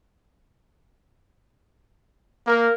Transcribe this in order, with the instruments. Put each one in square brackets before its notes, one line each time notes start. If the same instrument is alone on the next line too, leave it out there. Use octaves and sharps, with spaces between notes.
[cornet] A#3 [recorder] A#4